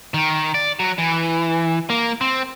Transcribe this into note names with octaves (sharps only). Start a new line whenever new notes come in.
D#3
D5
F#3
E3
A#3
C4